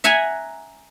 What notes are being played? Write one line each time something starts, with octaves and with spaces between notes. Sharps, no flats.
E5 F#5 G#5 A#5